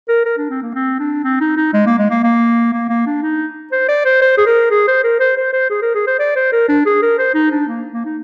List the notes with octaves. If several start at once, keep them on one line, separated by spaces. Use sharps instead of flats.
A#4
A#4
D4
C4
A#3
C4
D4
C4
D#4
D#4
G#3
A#3
G#3
A#3
A#3
A#3
A#3
D4
D#4
C5
D5
C5
C5
G#4
A#4
G#4
C5
A#4
C5
C5
C5
G#4
A#4
G#4
C5
D5
C5
A#4
D4
G#4
A#4
C5
D#4
D4
A#3
A#3
D#4